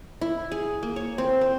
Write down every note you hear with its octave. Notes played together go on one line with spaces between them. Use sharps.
E4
G#4
A#3
C#5
C4
C5